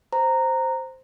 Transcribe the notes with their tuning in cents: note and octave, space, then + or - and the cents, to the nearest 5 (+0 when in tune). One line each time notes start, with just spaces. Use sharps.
C5 +0 A#5 -10